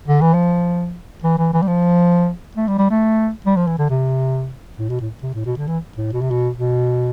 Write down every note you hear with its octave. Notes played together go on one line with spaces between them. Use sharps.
D3
E3
F3
E3
E3
E3
G3
F3
A3
G3
G3
A3
G3
F3
E3
D3
C3
A2
B2
A2
C3
A2
B2
D3
E3
A2
B2
C3
B2
B2